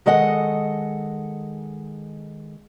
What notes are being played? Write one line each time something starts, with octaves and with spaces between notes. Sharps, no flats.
D#3 G#3 A4 D#5 F#5